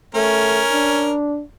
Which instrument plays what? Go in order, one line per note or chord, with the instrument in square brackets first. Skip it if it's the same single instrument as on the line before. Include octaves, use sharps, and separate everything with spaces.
[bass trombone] A3 [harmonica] C#4 A#4
[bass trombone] D4